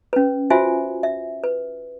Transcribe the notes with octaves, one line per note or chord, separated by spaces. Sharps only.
C#4 B4
F4 F#4 C5 E5 G#5
E5
B4